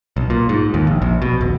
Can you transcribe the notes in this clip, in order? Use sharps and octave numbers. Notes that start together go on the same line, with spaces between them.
B1
A#2
G#2
D#2
A#1
A#1
B2
D#1